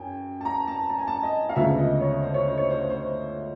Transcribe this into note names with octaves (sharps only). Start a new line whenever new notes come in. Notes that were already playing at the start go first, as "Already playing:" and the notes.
Already playing: F#2 G5 G#5
A5
A#5
A5
A5
G#5
A5
D#5
F5
D2 C#3 F3 G#3 B3 E5
D#5
C#5
C5
C#5
C5
C#5
C5
C5